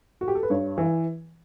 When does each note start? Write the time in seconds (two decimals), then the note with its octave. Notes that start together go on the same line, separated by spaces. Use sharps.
0.21 F#4
0.28 G4
0.35 A4
0.43 B4
0.50 G2 C#5
0.78 E3